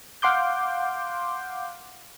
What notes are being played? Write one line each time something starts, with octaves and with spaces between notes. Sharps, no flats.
F5 F#5 C6 D6 G6